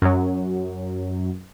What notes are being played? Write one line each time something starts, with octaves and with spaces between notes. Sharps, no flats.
F#2 F#3